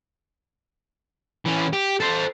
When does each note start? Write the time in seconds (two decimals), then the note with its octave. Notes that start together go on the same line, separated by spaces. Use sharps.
1.45 E3 C#4
1.73 G4
2.01 A4 C5